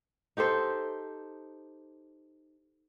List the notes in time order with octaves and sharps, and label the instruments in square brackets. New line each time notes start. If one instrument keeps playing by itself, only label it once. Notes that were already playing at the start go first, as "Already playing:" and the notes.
[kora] D#4 G4 A4 C5